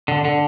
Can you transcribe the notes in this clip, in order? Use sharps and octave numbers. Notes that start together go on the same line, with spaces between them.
D3
D3